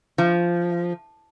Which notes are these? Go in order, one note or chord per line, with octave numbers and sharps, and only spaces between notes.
F3